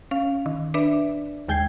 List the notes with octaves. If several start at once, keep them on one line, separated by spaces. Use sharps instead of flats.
C#4 F5
D#3
D4 B4 D5 E5
D#2 G#3 G5 G6 G#6 C7